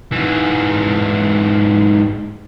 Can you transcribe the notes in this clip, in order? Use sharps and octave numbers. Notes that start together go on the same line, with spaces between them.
G#2 E3